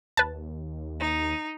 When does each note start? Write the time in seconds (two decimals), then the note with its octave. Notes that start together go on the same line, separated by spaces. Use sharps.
0.17 D#2 B4 A5
0.99 D#4